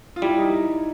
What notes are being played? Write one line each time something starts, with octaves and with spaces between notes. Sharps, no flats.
F4
G3 E4
D#4